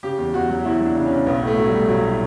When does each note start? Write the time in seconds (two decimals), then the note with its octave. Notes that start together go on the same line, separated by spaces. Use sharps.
0.03 C#3 G4
0.18 E2
0.34 E2 F#4
0.50 F#3
0.65 E2 E4
0.81 F#3
0.86 D4
0.96 C#3
1.06 C#4
1.11 C#3
1.26 B1 B3
1.43 A2 A3
1.57 F#3
1.68 G3
1.73 A2
1.88 B1 F#3
2.04 A2